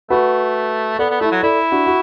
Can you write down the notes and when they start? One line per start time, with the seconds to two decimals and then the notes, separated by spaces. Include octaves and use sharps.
0.10 A3 F#4 B4
0.99 B3 A4 D5
1.10 B3
1.21 A3 E4 A4
1.31 F#3
1.43 E4 A4 D5
1.72 D4 F#4
1.87 F#4